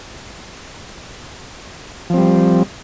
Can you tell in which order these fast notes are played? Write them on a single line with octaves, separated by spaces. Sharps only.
F3 C4 G3